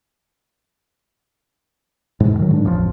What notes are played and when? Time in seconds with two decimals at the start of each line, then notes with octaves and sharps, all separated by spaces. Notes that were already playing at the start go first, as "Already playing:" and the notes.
2.20 G#2 B2
2.39 D#3 F#3
2.51 G#2 D4
2.65 D1 A1 F2 F3